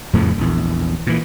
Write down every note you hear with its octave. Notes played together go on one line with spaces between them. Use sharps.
F2 A2 C#3 F3
A#1 E2
A#2 E3